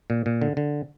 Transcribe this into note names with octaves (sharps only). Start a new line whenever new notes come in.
A#2
A#2
D3
D3